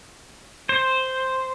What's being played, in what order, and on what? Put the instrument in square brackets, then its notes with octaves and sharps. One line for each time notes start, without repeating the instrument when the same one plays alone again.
[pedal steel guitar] C5